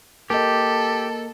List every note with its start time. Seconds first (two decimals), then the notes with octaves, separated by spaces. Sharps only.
0.30 A#3 G4 A4 D#5